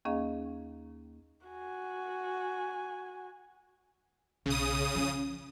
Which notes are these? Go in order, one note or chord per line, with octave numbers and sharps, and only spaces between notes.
D#2 A#3 C#4 G#4 D#5 F5
F#4 G#5
B1 C#3 D#6
F3 C#4